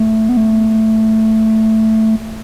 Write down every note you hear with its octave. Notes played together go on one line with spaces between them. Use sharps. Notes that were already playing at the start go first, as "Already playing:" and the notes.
Already playing: A3
B3
A3